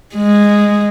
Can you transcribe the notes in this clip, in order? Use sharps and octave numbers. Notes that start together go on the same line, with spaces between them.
G#3